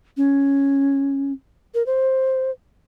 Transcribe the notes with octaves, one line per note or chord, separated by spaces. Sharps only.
C#4
A#4
C5